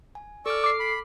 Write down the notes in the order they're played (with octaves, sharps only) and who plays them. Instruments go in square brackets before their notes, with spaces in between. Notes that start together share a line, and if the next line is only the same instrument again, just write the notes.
[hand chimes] G#5
[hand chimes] A4 F6 [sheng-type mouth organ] D5 C#6 E6
[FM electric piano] D6 C7
[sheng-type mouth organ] B5